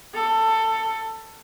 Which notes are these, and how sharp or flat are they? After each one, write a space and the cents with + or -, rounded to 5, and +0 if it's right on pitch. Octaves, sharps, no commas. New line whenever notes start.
A4 +15